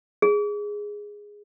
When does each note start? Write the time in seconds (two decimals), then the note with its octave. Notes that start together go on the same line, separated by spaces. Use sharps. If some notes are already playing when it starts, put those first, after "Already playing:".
0.22 G#4